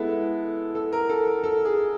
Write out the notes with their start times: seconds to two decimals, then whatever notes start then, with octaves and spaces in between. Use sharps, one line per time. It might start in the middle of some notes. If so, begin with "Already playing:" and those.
Already playing: G#3 B3 E4 A4
0.75 A4
0.93 A#4
1.09 A4
1.27 A#4
1.44 A4
1.65 G#4